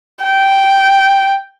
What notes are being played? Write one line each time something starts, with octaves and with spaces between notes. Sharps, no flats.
G5